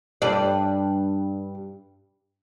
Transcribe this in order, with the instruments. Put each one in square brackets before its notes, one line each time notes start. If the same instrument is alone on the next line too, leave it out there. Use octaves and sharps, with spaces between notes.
[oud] G2 D5